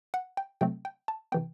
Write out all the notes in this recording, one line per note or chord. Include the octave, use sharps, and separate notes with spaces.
F#5
G5
C3 F#3 A3 C4 G5
G5
A5
C3 E3 B3 G5